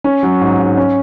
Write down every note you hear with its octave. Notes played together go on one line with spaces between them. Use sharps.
C#4
F#3
G#2
G#2
C#4